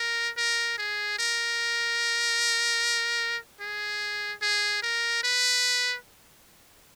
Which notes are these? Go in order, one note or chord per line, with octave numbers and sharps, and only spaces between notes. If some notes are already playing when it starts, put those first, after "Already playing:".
Already playing: A#4
A#4
G#4
A#4
G#4
G#4
A#4
B4